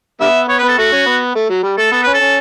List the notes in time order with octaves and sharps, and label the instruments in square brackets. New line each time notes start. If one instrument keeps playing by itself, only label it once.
[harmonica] D3 G3 B3 [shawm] E5
[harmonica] B3 [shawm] C#5
[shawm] B4
[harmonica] B3
[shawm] A4
[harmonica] A3 [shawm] F#4
[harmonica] C#4
B3
A3
F#3
G3
[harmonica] A3 [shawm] A4
[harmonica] B3 [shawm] A4
[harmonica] C#4 [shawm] B4
[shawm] A4
[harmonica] C#4